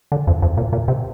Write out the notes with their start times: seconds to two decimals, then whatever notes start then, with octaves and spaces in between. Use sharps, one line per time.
0.12 D3
0.27 F2
0.42 F2
0.57 A#2
0.73 A#2
0.88 C3